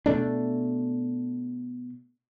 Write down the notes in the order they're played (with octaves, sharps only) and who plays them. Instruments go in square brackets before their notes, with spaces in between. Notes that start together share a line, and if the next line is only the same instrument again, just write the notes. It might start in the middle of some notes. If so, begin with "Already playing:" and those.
[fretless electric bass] B2 A3 D4